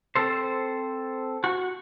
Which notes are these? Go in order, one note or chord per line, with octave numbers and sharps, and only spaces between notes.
C4 A4 C5
F#4